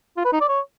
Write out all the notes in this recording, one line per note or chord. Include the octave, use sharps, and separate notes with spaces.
F4
B4
D#4
D5
C#5